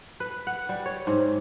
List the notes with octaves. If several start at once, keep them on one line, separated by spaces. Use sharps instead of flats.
B4
F#5
G3
C#5
G#2